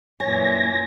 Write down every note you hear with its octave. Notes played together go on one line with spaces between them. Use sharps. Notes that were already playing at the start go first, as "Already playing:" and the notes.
F#2 A#2 E3 C#5 G#5 A#6